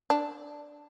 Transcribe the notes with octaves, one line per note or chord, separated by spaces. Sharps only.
D4